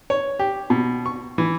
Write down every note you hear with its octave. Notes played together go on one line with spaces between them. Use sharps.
C#5
G4
B2
C#6
E3